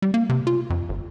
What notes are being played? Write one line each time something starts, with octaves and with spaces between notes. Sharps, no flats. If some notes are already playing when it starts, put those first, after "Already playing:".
G3
A#3
C3
F4
F2
G1